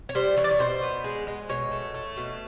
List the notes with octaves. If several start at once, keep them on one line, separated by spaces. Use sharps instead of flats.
C#5
G3 C5
E3 C#5
D5
C#5
B2 C5
B3
G#3
G#3
B2 C#5
A3
A3
B2